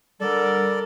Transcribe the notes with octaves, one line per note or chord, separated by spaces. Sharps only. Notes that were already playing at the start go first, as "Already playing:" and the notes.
D3 G3 A4 A#4 D5